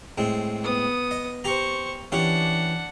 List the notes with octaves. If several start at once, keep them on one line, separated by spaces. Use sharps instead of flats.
A2 G#3 C4
B3 D#6
D#5
G4 C5 A#5 C#6
E3 C#4 D4 G4 F#5